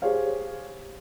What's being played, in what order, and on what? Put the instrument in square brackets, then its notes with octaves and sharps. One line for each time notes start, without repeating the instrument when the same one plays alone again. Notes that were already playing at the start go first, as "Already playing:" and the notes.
[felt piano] G4 G#4 C5 C#5 F5